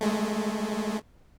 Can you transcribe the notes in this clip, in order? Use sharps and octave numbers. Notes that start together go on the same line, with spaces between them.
G#3 A3